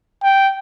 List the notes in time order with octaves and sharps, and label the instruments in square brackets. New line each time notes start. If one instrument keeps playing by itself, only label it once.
[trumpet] G5